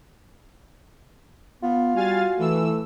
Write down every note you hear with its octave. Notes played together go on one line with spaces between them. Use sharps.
B3 F4
G3 F#4 F5 G#5 A6
E3 A3 E6